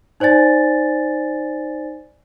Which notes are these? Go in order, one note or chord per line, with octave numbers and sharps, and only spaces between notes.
D#4 C5 D5 G#5 A6